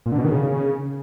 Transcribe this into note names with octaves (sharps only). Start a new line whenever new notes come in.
A#2
D3
B2
D#3
C#3